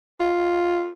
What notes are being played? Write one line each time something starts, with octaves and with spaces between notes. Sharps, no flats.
F4